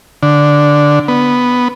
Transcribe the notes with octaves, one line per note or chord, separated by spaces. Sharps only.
D3
B3